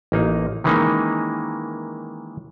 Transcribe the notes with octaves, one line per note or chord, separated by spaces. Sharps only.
A1 A#3 D#4
D#3 E3 G#3 A#3 C#4 D#4